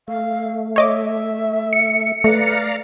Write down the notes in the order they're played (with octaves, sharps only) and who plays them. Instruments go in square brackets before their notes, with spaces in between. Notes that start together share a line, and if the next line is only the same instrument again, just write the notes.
[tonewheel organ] A3 [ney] F5
[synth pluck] C#5 D#5 D6 [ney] E5
[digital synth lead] C#7
[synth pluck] A3 [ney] B4 [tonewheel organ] D5 F5 A#5